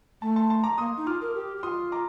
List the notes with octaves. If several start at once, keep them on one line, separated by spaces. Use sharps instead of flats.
A3 A5
A5 C6
A5 C6
A#5 D6
A#3 C6 D#6
D#4
F4 D6 F6
A#4
G4
G4
F4 C6 D#6
A#5 D6